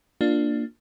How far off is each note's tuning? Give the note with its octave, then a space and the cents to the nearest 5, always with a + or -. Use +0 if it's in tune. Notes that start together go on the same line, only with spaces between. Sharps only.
A#3 +0 D4 +10 F4 +0